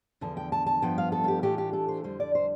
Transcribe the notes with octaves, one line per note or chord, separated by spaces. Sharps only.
E2 D3 F3 A5
G5
A5
A5
G2 F3 B3 G5
F5
A4
F4
G4
A2 E3 A3 D4 F4 G4
G4
A4
C5
F2 D3 G3 C5
D5
C5